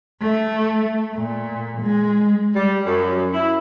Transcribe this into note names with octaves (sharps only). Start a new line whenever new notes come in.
A3
A#2
G#3
G3
F#2
E4